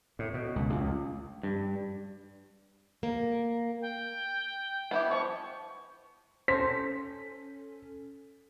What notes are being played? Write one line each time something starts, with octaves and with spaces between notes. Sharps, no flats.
A2
B2
C#2
C#2
G2
A#3
G5
B3 E4 G4
E3 F3 C#6
C#4 A4 C5 B6